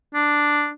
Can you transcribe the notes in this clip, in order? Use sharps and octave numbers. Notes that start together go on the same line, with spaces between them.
D4